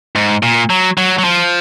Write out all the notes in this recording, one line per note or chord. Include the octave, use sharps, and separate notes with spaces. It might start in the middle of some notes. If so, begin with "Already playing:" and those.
G#2
A#2
F#3
F#3
F#3
F3